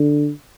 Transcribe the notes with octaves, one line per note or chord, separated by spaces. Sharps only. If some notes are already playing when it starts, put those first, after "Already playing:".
Already playing: D3